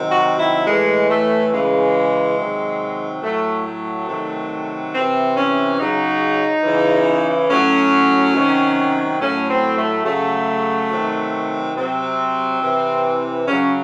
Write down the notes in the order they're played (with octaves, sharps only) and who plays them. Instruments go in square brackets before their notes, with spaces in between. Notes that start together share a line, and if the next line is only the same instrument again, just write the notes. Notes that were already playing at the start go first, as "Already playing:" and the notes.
Already playing: [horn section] C3 D#3 F#3
F#4
E4
A2 E3 G#3
A3
C#3 E3 G#3
C3 D#3 F#3
A2 F#3 A3
A3
C3 D#3 F#3
C3 E3 C4
C#4
C#3 F#3 D#4
C#3 E3
A2 F#3 C#4
C3 D#3 F#3
A2 F#3 C#4
C4
A3
C#3 F#3 A3
C3 D#3 F#3
C3 F#3 C4
C3 E3
C#3 F#3 C#4